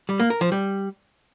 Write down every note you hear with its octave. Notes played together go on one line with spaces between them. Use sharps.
G3
A#3
A#4
F3
G3